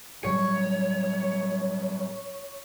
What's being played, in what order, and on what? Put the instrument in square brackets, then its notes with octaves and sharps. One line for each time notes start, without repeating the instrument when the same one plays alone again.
[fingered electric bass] A2 F#3 G3 [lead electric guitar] C#5